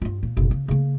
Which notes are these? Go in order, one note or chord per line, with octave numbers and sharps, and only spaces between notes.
G2 F4
A#2
F#1 B1
C#3
C#3 A#3